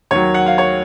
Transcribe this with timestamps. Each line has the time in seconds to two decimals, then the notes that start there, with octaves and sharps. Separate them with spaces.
0.11 D#2 D#3 F#3 C#5
0.34 F#5
0.46 F5
0.58 C#5